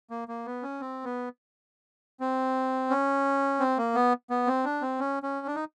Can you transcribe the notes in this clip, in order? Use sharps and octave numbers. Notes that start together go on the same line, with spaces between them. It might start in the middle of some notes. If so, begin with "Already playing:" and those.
A#3
A#3
B3
C#4
C4
B3
C4
C#4
C4
A#3
B3
B3
C4
D4
C4
C#4
C#4
D4
D#4